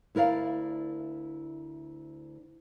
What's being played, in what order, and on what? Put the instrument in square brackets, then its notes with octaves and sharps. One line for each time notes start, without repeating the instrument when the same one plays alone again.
[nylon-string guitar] D2 E4 A#4 D5 F5